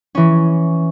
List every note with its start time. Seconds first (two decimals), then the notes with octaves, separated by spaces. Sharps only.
0.15 E3 C#4